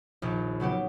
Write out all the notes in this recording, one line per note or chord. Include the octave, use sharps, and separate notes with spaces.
A#1 D#2
C#3 F#3 B3 G4